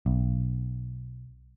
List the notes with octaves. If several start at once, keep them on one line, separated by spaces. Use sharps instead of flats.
B1